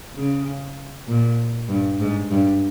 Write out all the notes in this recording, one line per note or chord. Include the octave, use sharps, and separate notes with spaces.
C#3
A#2
G2
G#2
G2